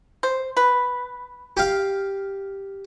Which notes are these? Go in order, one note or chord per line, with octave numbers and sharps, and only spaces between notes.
C5
B4
G4 F5